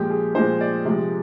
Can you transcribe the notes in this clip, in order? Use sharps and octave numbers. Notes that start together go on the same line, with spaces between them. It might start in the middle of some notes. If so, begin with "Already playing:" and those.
Already playing: A#2 F3 G#3 G4
G#4
A#2 F3 G#3 C5
D5
C3 F3 G#3